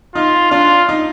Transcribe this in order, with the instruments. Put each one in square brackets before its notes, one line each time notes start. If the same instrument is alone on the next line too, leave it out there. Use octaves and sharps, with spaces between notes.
[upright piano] D#4 [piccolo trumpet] F4
[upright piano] D4 [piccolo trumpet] F4
[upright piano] D#4